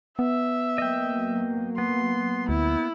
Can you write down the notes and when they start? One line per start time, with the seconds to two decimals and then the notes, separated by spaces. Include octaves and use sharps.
0.19 B3 E5
0.78 F#3 A#3 D#5 G5
1.78 B3 C6
2.49 D2 E4